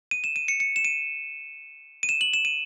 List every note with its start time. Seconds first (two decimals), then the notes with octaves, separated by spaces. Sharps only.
0.11 D#7
0.24 E7
0.36 D#7
0.48 C#7
0.60 C#7
0.76 E7
0.85 D#7
2.03 D#7
2.09 E7
2.21 F#7
2.34 E7
2.45 D#7